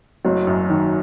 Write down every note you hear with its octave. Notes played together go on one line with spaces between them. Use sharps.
F#1 F#3
F#2
D#3